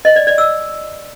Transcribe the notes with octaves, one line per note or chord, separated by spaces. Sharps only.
D#5
D5
D5
E6